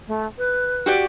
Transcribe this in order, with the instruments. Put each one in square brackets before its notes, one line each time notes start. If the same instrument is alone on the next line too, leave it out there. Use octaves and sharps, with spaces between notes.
[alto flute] A3
B4
[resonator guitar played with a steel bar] F#4 G4 D5